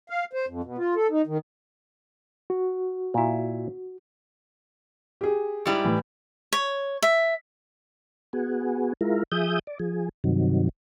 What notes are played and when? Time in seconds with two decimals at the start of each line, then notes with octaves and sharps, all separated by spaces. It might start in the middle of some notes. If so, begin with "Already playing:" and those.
0.10 F5
0.33 C5
0.48 F2
0.64 B2
0.78 F4
0.96 A4
1.10 D#4
1.27 D#3
2.50 F#4
3.14 A#2 E4
5.21 G4 G#4
5.66 G#2 G3 E4
5.84 A2 E3
6.53 C#5
7.02 E5
8.33 B3 F#4 G#4
9.01 G#3 E4 F4 A#4
9.32 F3 G#4 E5 D#6 G6
9.67 D5
9.79 F3 G#4
10.24 G2 C3 D#3 F#3